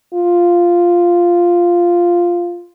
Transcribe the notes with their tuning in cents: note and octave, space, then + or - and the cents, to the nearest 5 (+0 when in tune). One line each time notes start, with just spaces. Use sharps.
F4 +0